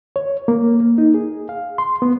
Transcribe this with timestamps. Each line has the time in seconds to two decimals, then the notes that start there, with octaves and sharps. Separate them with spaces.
0.16 C#5
0.48 A#3
0.80 A#3
0.98 D#4
1.14 G#4
1.49 F5
1.78 C6
2.02 B3